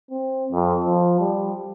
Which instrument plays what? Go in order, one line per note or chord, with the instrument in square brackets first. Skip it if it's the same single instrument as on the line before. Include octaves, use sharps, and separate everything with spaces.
[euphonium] C4
F2
F3
G3